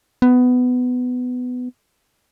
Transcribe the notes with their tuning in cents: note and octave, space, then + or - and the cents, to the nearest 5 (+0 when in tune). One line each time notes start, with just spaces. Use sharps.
B3 +15